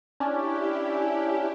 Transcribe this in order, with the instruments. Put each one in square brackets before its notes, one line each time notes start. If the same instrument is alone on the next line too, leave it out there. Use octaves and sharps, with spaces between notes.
[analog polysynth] C#4 D4 [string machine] E4 G4